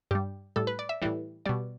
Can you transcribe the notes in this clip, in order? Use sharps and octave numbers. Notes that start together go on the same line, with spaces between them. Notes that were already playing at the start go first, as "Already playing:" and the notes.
G2 G3 G4
A2 G3 A4
B4
D5
E5
A2 E3 G3
B2 G3 D5